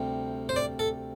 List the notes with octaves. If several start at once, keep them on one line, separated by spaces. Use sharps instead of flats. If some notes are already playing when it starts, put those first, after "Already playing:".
Already playing: D2 C3 G3
C5
D5
A4